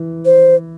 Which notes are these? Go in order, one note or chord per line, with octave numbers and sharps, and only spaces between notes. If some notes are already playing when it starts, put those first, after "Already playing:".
Already playing: E3
C5